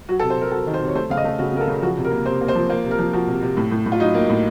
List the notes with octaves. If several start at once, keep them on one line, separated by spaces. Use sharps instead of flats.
F#3 F#4
A4
C3
C5
C3 A#4
F#3 A4
D#3
C5
C3
C#5
A3 C5
C#3 F5
D#5
A3
C#3 F#4
C#3 A#4
A4
C#3
F3 F#4
C3
A#4
A#3
C3 C5
A#3
C5
F3
A#3 C5
C3
A#4
F3
F3 F#4
C3
C3
A2
A2
A2
F4
F#3 D#4
A#3
A2